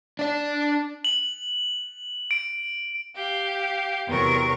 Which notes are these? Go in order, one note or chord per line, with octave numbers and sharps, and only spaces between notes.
D4 D5
F#7
D7
G4 F5
E2 C3 F#3 A#4 C#6